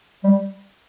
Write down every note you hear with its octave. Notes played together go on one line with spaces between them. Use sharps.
G3